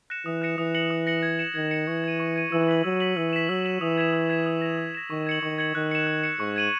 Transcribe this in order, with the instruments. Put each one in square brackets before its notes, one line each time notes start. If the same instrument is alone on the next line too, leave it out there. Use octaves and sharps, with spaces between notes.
[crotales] F#6 A#6 C#7 E7
[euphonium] E3 [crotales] D#6
[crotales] F#6 A#6 C#7 E7
[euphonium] E3 [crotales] D#6
[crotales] A#6 C#7 F#7
D#6
A#6 C#7 F#7
G#6
C#7 E7
[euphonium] D#3 [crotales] G#6
[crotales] C#7 E7
[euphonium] E3 [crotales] C#6
[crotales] G#6 D#7
C#6
G#6 D#7
[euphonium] E3 [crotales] E6
[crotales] B6 F#7
[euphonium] F#3 [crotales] E6
[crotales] B6 F#7
[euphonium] E3 [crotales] E6
[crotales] B6 E7
[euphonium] F#3 [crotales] E6
[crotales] B6 E7
[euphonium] E3 [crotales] D#6
[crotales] G#6 B6 E7
D#6
G#6 B6 E7
D#6
A#6 E7
D#6
A#6 E7
[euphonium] D#3 [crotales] C#6
[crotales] G#6 C#7 F#7
[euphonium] D#3 [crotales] C#6
[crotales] G#6 C#7 F#7
[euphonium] D#3 [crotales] F#6
[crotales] C#7 E7
F#6
C#7 E7
[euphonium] G#2 [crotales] C#6
[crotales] G#6 D#7 F#7